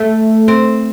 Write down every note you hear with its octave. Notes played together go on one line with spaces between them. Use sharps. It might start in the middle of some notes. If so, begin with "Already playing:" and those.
Already playing: A3
C4